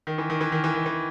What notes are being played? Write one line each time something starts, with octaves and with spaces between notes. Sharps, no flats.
D#3
E3
D#3
E3
D#3
E3
D#3
E3